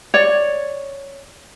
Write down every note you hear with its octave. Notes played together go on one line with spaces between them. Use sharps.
C#5 D5